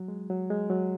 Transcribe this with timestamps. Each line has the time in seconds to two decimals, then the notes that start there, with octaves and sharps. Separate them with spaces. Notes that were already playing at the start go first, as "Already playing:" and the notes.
Already playing: F#3
0.08 G#3
0.30 F#3
0.50 G#3
0.70 F#3